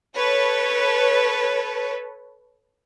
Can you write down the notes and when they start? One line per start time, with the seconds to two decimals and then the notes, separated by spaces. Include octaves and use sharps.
0.16 A4 B4 C#5